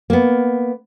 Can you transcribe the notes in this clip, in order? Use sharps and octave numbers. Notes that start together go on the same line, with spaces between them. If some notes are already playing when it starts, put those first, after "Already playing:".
A#3 B3